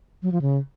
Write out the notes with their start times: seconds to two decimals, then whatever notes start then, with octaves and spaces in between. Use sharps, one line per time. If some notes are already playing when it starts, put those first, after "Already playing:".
0.23 F#3
0.32 F3
0.42 C#3